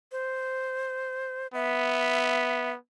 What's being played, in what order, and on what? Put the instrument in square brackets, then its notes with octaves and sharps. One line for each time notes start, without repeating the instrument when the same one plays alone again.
[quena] C5
[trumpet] B3 [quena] E5